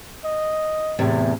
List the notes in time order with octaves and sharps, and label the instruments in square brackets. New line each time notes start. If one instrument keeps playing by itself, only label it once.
[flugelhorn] D#5
[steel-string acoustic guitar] E2 A2 C3